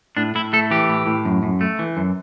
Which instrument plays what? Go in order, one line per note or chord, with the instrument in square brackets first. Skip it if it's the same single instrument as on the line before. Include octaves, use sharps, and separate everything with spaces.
[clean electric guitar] A2 D4
A2 E4
A3 A4
E3 G4
A2
A2
F#2
F#2
A3
E3
F#2